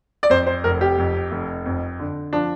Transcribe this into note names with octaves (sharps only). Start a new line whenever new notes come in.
D5
F2 C5
C5
F1 A#4
G4
F2
F1
F2
D3
F3 D4